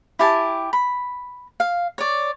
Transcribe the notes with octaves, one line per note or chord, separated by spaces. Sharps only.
E4 G4 G#5 A5
B5
F5
C#5 D5